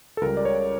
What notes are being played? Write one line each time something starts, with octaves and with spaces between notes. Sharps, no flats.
A4
C#2 C#3 G3 A#4
D5
C#5